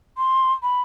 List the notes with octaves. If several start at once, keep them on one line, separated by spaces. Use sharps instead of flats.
C6
B5